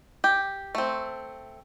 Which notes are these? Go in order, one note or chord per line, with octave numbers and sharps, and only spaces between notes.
G4
A3 C4